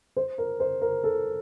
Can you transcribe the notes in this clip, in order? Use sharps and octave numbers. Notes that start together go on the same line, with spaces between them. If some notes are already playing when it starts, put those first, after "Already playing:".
C5
A#4
C5
A#4
A4